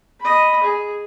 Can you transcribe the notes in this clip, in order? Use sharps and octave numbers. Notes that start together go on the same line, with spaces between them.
D#5 B5
G#4